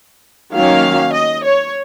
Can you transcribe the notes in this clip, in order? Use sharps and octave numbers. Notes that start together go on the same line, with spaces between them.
D#3 F#3 A#3 C#4 F5
D#5
C#5